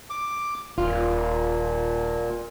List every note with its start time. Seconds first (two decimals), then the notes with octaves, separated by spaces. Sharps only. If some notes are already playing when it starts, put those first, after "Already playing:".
0.10 D6
0.78 D#1 A#2 F4